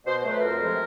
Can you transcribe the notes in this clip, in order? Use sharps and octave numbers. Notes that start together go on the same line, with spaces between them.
B2 C5
F#3 A3
B4
F2 A#4
C3 F3 G#3